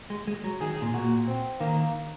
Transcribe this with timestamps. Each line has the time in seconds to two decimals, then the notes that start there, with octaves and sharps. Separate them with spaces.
0.10 G#3
0.27 G#3
0.44 F#3
0.61 D#3 G#4
0.82 A#2
0.94 A#2 F#4
1.27 C4
1.60 D#3 A#3